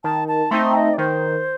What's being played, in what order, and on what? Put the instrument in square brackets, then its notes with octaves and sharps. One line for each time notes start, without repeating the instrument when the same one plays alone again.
[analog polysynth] D#3 [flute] A5
[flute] A5
[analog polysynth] A3 C4 D#4 [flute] C6
[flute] D#5
D5
[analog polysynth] D#3 [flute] C5